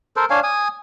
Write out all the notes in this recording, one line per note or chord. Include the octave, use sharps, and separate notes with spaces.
A4 A#4 C5
D4 C#5 F5 G#5
G#5 D#6